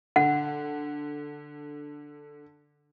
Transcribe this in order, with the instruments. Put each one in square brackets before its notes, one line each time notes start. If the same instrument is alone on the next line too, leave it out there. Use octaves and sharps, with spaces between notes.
[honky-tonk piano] D3 [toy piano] F#5